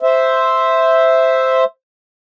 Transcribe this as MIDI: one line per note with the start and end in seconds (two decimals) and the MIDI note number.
0.02 1.64 72
0.02 1.64 76